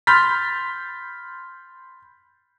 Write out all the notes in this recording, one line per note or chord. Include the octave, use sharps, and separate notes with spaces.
B5 C6 F6 G6 A6 B6